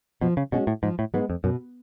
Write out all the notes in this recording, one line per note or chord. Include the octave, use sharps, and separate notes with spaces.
B2 F3
C#3
B2 G#3 C#4 F#4
A2
G#2 F3
A2
G#2 G#3 B3
F2
F#2 B2